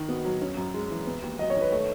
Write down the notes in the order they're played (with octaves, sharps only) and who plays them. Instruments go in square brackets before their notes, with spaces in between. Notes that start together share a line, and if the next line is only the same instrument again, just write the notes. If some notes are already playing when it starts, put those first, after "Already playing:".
Already playing: [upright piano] D#3 D#4
[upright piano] B3 [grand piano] F#4
[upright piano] F#3
C#4
F#2
G#3
E3
B3
D#2
[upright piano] F#3 [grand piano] D#5
[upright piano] D#3 [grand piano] C#5
[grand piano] B4
[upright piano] A3 [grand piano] C#5